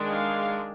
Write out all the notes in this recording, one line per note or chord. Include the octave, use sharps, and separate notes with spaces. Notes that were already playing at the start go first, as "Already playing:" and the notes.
Already playing: D#3 G#3 D4
F5